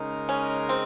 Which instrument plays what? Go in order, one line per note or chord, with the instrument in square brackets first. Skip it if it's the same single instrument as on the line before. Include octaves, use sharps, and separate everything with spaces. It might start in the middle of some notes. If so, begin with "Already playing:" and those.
Already playing: [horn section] C#3 G#3 D#4 A#4
[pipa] C#4
C4